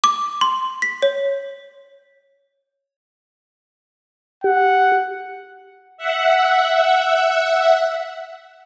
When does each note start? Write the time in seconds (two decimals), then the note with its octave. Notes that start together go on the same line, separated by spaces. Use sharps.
0.04 D6
0.41 C6
0.82 B6
1.02 C#5
4.44 G4 F#5
5.97 E5 F#5